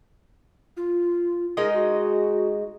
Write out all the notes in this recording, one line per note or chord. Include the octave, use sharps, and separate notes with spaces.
F4
G#3 D#4 A#4 D#5
F#4